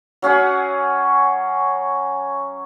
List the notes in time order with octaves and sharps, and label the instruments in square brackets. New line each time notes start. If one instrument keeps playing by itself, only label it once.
[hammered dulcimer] F#3 C#4 G#4 F#5